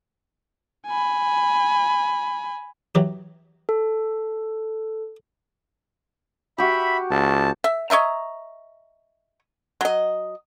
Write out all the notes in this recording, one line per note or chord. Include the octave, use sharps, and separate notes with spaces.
G#5 B5
E3 F#3 G4
A4
F#4 G4 E5 B5
C#2 A5
E5
C#5 D#5 E5 A#5
F#3 D#5